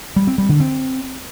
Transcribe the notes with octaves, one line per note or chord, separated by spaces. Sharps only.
G3
C4
G3
D3
C4